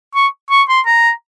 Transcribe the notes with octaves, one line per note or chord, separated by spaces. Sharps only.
C#6
C#6
C6
A#5